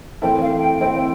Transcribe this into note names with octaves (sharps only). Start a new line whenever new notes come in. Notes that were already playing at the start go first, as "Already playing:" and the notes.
E3 A3 C4 E4 A4 G5
F5
G5
E3 A3 C4 E4 A4 G5
G5